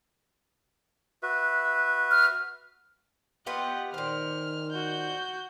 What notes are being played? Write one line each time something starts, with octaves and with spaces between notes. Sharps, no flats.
F#4 B4 E5
F6
B3 F4 G4 D#5 F#5
A#2 D#3 C5 F6
F#4 G6